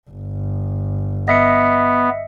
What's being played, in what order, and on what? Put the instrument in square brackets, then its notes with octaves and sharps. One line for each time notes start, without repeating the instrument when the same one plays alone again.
[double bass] G1
[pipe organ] B3 [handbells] D#5 E5 C#7